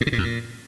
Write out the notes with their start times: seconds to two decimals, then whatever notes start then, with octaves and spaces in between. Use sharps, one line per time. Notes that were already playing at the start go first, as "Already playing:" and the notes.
0.01 A2
0.07 C#3
0.12 A#2
0.18 F2
0.24 A#2